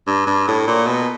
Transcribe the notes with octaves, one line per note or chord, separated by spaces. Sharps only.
G2
G2
A2
A#2
B2